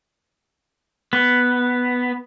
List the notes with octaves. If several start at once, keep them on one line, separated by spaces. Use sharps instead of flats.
B3